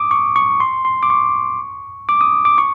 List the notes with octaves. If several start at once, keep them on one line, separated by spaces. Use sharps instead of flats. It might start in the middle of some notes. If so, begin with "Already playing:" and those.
Already playing: D6 D#6
C#6
C#6
C6
C6
D6
C#6
D6
D#6
D6
C#6